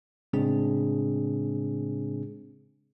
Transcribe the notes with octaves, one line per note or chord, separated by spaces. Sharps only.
A2 C#3 G#3 C4 D4 G#4